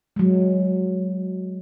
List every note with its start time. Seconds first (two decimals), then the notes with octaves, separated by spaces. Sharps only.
0.16 F#3 G#3